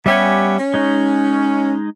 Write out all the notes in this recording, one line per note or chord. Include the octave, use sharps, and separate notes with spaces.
G3 B3 C#4 G4 E5 G#5
C#4
G#3 D#4